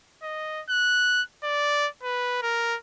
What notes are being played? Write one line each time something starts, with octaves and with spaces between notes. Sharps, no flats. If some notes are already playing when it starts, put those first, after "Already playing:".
D#5
F#6
D5
B4
A#4